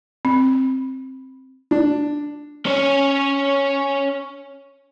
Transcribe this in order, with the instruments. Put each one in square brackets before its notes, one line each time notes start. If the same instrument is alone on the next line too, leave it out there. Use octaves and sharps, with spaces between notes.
[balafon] C4
[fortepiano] D4
[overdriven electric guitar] C#4 C#5